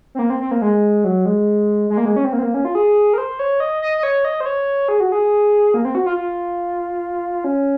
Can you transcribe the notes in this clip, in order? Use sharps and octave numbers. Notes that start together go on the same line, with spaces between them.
C4
A#3
C4
C4
A#3
G#3
F#3
G#3
G#3
A#3
G#3
C#4
C4
A#3
C4
A#3
C#4
F4
G#4
A#4
C5
C#5
D#5
D#5
D#5
C#5
D#5
C5
C#5
G#4
F#4
G#4
A#3
C4
F#4
F4
F4
C#4